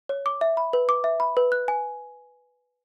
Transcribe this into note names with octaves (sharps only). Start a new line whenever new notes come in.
C#5
D6
E5
B5
B4
D6
E5
B5
B4
F#6
G#5